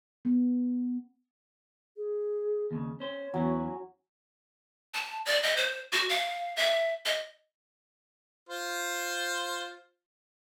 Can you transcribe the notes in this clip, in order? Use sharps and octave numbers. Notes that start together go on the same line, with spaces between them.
B3
G#4
D#2 A#2 C#3
C#4 C5 C#5
E2 E3 F#3 B3 C#4
A5
D5
D#5
C5
F#4
F5
E5
D#5
F4 C5